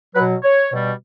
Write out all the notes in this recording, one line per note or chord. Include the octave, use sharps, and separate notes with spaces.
B2 F#3 B4
C#5
B2 G3